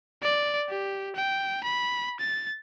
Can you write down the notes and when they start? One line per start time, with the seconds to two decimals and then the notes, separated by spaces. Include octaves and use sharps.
0.22 D5
0.69 G4
1.16 G5
1.64 B5
2.20 A6